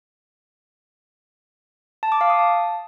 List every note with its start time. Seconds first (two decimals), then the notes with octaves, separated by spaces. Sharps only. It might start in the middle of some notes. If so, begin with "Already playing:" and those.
2.03 A5
2.12 D6
2.21 F5
2.30 D#6
2.39 A5